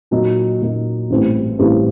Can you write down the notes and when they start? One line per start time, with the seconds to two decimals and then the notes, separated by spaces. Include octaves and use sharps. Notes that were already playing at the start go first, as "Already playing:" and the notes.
0.11 A#2 F#3 A#3 D#4
0.61 A#2 F#3 A#3 D#4
1.10 A1 G2 E3 A3 C4
1.59 A1 G2 E3 A3 C4